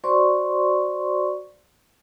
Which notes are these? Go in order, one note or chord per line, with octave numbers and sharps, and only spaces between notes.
F#4 C5 D5 C6 C#6